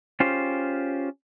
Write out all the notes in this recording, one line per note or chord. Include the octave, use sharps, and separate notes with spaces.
C#4 F4 G4 G#4 C5